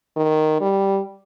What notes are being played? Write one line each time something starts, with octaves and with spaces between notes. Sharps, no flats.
D#3
G3